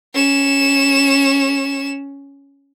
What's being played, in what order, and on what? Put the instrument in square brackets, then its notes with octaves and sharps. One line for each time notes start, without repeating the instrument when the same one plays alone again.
[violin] C#4 E7